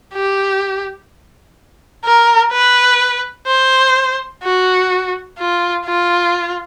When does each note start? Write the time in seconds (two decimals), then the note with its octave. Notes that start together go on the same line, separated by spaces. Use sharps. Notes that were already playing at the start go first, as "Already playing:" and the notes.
0.14 G4
2.05 A#4
2.52 B4
3.47 C5
4.43 F#4
5.38 F4
5.85 F4